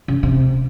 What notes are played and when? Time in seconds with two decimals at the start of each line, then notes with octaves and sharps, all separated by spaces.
0.08 C#3
0.23 C3